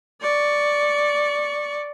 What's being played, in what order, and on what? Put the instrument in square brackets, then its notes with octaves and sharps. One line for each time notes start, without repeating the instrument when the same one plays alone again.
[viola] D5 C#6